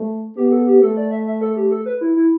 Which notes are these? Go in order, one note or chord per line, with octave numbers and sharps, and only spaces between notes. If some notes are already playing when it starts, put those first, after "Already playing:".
Already playing: A3
B3 G4
G4
A4
G4
A3 A4
D5
E5
E5
A4
G4
A4
B4
E4
E4